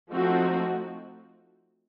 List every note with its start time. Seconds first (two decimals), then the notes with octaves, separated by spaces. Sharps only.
0.11 F3 A3 C4 D#4 F#4